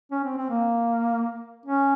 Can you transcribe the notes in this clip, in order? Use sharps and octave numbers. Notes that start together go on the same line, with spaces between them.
C#4
C4
C4
A#3
C#4